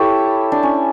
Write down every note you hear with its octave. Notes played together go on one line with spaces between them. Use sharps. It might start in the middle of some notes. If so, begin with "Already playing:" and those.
Already playing: E4 G4 A4 C#5
D4
C#4